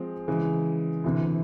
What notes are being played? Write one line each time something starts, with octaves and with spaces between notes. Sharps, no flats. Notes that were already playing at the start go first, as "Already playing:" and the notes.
Already playing: F3 G#3 C4
C#3 E3 G#3
D2 C3 E3